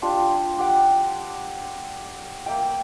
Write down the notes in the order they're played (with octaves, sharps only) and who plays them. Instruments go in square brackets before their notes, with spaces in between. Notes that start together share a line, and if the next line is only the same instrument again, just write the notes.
[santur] D4 F4 G4 C6
G4 F#5 G5
A#3 E5 G5